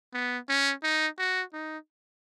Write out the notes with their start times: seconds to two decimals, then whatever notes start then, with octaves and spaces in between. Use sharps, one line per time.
0.14 B3
0.49 C#4
0.83 D#4
1.18 F#4
1.53 D#4